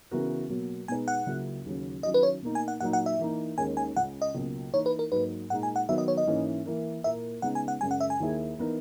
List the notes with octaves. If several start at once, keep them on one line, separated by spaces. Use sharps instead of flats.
C#3 E3 B3 F#4 A#4
B2 F#3 A#3
B2 G#3 D#4 G#4 B4 G#5
F#5
C#2 C#3 F#3 A#3 E4
D#2 C#3 F#3
D#3 F#3 C#4 E4 D#5
B4
C#5
B2 A#3 D#4
G#5
F#5
A#2 F#3 A#3 D#4 F#5
F#5
E5
E3 A#3 D#4
D#2 D#3 G#3 C#4 G#5
G#5
C#2 C#3 G#3 F#5
D#5
C#2 B2 F#3 A#3
E3 A#3 D#4 C#5
B4
A#4
G#2 F#3 A#3 B4
A#2 G#3 D#4 F#5
G#5
F#5
D#3 F#3 B3 E5
D#5
C#5
D#5
G#2 E3 A#3 C#4 E4
E3 A#3 E4 A#4
A#2 A#3 E4 A#4 E5
C#3 G#3 B3 D#4 F#5
G#5
F#5
F#2 C#3 G#3 C#4 G#5
F#5
E5
G#5
D#2 D#3 A#3 E4 G#4
E3 B3 D#4 A#4